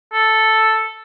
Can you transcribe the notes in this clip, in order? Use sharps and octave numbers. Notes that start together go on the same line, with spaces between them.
A4